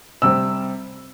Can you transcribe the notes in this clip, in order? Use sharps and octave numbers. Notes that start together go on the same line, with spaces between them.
C3 G3 C4 E6